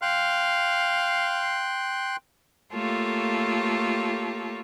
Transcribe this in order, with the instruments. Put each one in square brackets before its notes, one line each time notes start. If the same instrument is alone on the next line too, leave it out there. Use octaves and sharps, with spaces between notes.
[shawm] F5 [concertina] G5 C6 F#6
[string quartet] A3 A#3 F4 G4 A4 C#5